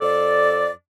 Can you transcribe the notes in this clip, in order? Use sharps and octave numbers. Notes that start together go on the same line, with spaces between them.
F2 A4 D5